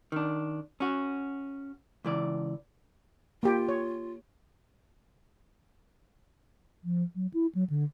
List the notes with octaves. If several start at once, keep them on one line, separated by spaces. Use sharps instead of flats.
D#3 D4
C#4 F#4
C#2 E3 D5
A#3 F4 G4
C#5
F3
F#3
E4
F#3
D3